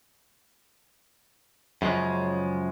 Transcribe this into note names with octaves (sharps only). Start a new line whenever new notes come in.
F#2 C#3 F3 G#3